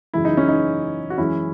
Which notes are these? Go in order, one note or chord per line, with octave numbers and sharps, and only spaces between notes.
F#2 C#3 E3 G#3 E4
D#4
C#4
D#4
F#4
F#2 E3 G#3 C#4 E4